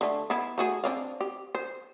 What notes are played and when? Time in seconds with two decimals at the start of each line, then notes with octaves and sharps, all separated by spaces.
0.01 D3 A3
0.30 B3 E4
0.58 A3 F#4 G#4
0.84 C4 D4 F5
1.21 G4
1.55 C5